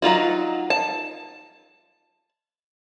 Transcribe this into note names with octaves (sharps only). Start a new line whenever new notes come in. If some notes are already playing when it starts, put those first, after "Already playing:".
F#3 D#4 F4 F#4
A5